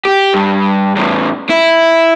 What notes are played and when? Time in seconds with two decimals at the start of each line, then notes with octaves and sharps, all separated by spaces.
0.05 G4
0.34 G2
0.96 E2 A2
1.50 E4